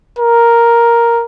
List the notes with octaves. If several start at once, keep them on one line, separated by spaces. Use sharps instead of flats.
A#4